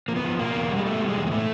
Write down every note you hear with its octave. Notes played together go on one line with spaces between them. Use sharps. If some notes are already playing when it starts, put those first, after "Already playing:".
F3 A#3
B3
F3
B2 A#3
E2
G3
G#3
B2 A3
G3
G#3
E2
A#3
A2 A3